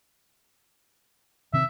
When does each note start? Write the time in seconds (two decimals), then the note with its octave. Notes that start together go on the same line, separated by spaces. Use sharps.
1.53 C3 D#3 C4 E5